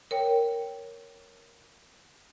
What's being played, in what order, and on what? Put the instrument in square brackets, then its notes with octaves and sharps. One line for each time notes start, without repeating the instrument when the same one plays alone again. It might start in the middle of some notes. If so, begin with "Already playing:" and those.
[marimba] A#4 C#5 G5